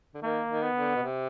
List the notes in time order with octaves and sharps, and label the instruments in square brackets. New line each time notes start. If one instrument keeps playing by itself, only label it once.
[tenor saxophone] D3
[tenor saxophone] D#3 [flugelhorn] A#3
[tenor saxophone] D#3
[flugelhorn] B3
[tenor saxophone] D3
B2
C3